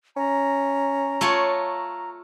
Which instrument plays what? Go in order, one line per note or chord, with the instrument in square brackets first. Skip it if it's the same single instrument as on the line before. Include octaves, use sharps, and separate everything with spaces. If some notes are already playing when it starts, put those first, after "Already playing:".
[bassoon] C#4 [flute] A#5
[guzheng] A3 F4 C#5